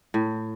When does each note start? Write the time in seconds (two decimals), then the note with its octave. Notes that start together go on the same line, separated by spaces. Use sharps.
0.14 A2